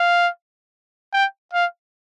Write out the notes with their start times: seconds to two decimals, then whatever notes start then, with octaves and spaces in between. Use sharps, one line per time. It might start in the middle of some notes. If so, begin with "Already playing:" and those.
Already playing: F5
1.13 G5
1.53 F5